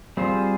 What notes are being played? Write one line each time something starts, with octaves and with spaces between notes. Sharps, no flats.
G3 C4 F4 G#4 C5